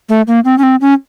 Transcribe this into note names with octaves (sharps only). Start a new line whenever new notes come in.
A3
A#3
C4
C#4
C4
C#4